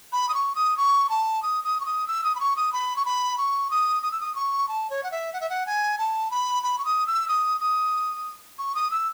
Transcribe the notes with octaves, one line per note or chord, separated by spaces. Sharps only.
B5
D#6
C#6
D#6
C#6
A5
D#6
D#6
C#6
D#6
E6
D#6
B5
C#6
D#6
B5
C#6
B5
C#6
D#6
D#6
E6
D#6
C#6
A5
C#5
F#5
E5
F#5
E5
F#5
G#5
A5
B5
B5
C#6
D#6
E6
D#6
D#6
C#6
D#6
E6